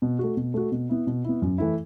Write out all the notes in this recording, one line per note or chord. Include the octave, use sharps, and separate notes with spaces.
B2
A3 F#4
B2
A3 F#4
B2
B3 E4
B2
B3 E4
F#2
E3 A3 E4